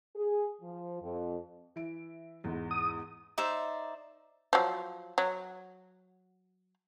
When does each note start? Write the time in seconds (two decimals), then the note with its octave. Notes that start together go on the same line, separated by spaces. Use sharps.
0.16 G#4
0.62 F3
1.01 F2
1.76 E3 E5 D7
2.44 E2 G#2
2.71 D#6
3.38 D#4 C5 D5 E5
4.53 F3 F#3
5.18 F#3